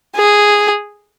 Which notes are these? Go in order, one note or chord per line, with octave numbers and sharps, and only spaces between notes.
G#4